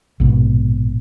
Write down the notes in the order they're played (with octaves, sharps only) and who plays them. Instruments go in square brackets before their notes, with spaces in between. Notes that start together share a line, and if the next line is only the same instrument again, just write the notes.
[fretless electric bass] A#1 G#2 B2